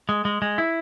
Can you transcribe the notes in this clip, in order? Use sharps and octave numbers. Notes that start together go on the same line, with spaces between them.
G#3
G#3
G#3
E4